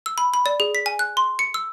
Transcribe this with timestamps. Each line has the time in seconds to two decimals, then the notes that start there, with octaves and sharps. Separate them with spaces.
0.06 E6
0.18 B5
0.34 B5
0.46 D5
0.60 G#4
0.75 B6
0.86 G#5
0.99 F#6
1.17 C6
1.39 C#7
1.54 E6